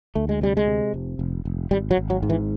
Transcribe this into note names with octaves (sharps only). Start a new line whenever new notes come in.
D2 A3
G#3
C3 G3
G#3
C3
F1
F1
F1
G#1 G3
F#3
G#1
F#3
G#2
E3